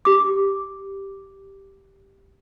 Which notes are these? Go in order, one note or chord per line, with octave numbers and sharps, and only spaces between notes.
G4 D6